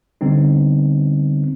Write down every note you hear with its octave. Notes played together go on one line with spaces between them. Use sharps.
D3 G3 B3 C4 D#4